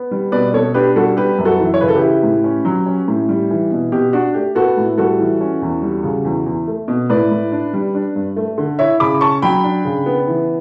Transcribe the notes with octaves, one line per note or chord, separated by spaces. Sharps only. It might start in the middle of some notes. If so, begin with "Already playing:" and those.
Already playing: B3
G3
B2 B4 D5
B2 A4 C#5
D4 G4 B4
G3 F#4 A4
B3 G4 B4
F#2
F#4 A4
E3
C#5
C#3 B4
A4
G4 B4
E4
A2
C#4
F#3
C#4
A2
G3
E3
B2
B2 G4
D4 F#4
A3 G4
B3 F#4 A4
A2
G3 F#4 A4
E3
C#4
E2
G3
C#3
E2
E2
A3
B2
A2 B4 D5
A2
D4
G3
D4
G2
A3
D3
E4 C#5 E5
C#3 B5 D6
C#4 A5 C#6
F#3 G5 B5
D4
C#3
B3
E3